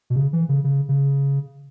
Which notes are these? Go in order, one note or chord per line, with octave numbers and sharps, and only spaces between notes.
B2
C#3
E3
C#3
C#3
C#3